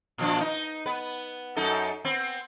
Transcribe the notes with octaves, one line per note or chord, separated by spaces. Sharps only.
A#2 F3 D4
D#4
B3 B4
F#2 D#4 A4
B3 C4